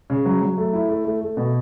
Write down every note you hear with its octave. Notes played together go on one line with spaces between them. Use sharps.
C#3
F#3
F#3
A3
E4
A3
A3
A3
B2